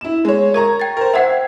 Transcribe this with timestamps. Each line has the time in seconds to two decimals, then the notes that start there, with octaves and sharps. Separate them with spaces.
0.01 E4 E7
0.25 G#3 C#5
0.54 A#4 A#5 C#6 G#6
0.80 G5 A6
0.97 A#4 C5
1.14 C5 E5 F#5 G5 G#6 C7